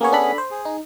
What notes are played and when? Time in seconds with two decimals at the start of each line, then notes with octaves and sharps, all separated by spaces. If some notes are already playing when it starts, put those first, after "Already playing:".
0.01 A#3 B3 C#4 G#4 C#5
0.12 D4 A4 B5
0.38 C5
0.51 G#4
0.65 D#4